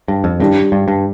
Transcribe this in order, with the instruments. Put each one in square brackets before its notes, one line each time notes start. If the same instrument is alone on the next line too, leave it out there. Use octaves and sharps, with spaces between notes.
[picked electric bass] G2
F2
[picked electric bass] G2 [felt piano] G3 D4 G4
[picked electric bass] G2
G2